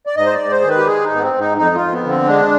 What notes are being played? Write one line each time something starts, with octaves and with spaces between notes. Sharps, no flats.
D5
G#2 D#5
C5
D5
G#2
C5
D#3 G#4
B4
G4
G#3 G#4
G#2 D#4
B3
C4
G#2
D#4
F2 D#4
F4
F2
B3
D3
C4
G#3 D4